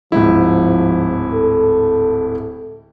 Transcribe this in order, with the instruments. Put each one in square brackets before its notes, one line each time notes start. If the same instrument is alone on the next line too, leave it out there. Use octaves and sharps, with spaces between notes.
[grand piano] D1 G#2 E4 [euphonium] F3
[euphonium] A4